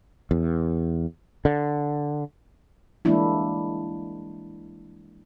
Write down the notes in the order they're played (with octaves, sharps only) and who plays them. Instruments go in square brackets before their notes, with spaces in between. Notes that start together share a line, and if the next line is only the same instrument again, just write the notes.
[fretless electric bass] E2
D3
[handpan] E3 G3 G#3 A#3 D4 E4